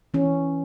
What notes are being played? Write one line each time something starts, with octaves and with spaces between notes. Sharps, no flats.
E3 C#4